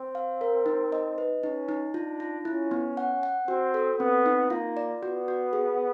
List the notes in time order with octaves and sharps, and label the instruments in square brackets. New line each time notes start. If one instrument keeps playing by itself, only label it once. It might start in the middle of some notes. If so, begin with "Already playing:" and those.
Already playing: [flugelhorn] C4
[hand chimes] F5
A#4
D#4
D#5
B4
[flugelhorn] C#4 [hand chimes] D#4
[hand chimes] D#4
[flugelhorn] D4 [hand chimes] F4
[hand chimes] F4
[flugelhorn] C#4 [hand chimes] E4
[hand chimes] B3
F#5
F#5
[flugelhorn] C4 [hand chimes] F#4
[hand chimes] A4
[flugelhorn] B3 [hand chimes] C4
[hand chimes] D#4
[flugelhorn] A#3 [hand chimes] F4
[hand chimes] D5
[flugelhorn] B3 [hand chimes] F#4
[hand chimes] F#4
G#4